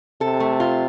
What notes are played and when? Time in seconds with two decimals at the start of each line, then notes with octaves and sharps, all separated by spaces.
0.21 C3 A4
0.40 A3
0.60 F4